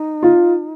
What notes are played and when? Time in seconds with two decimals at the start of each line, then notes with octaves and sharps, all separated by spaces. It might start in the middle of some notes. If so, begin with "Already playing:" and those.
Already playing: D#4
0.23 F4